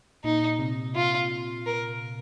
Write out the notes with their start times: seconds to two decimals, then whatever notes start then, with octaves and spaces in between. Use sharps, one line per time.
0.24 A#2 D#4
0.59 C3
0.95 F4
1.66 A#4